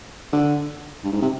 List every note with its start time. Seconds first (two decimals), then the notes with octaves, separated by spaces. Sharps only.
0.33 D3
1.04 G2
1.12 G#2
1.22 C3